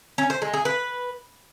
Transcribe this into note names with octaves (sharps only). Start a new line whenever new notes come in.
C#4
C5
G#3
G#4
B4